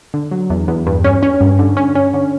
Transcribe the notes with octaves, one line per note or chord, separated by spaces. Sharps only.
D3
F#3
E2
E2
G2
C#4
C#4
G2
D3
C#4
C#4
D3